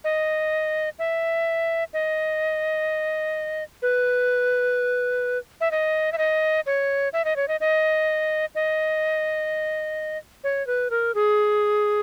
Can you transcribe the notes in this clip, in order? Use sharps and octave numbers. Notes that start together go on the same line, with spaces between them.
D#5
E5
D#5
B4
E5
D#5
E5
D#5
C#5
E5
D#5
C#5
D#5
D#5
D#5
C#5
B4
A#4
G#4